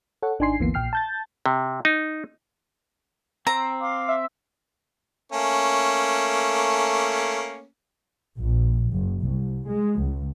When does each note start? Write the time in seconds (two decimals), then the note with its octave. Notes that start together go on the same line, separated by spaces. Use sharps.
0.22 A4 C#5 F#5
0.39 G#1 D4 D#4 G#5 C6 C7
0.59 G1 D2 E3 A#3 B3 C7
0.74 A#1 A#2 G5 F6 C7
0.93 A5 G6 A6
1.46 C3
1.85 D#4
3.47 C4 C5 G5 A#5 E6
3.80 F5 C6 D6
4.09 E5
5.32 A3 A#3 C#4
8.38 A#1
8.92 F#1
9.22 C2
9.67 G#3
10.00 C#2